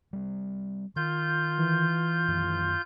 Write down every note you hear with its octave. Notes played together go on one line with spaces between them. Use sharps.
G3 C4
D#3 F4 G6
E3
F#2 D#3